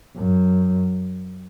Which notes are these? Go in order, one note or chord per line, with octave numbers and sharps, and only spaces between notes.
F#2